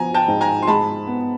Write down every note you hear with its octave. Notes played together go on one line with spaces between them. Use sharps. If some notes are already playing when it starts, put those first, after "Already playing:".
Already playing: F3 B3 G#5 A#5
G5 A5
G#2
G#5 A#5
C6
G#3 A5 B5
B3